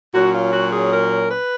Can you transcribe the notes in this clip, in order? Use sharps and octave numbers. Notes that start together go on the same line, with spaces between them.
A#2 F#3 C#4 F#4
F4
F#4
G#4
A#4
B4